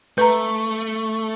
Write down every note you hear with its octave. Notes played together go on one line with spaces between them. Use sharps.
A3 B4 A#5